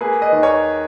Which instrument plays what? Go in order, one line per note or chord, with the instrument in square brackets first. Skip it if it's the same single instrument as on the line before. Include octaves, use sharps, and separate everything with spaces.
[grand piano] A#3 G#4 B4
B4 D#5
D#2
A#4 C#5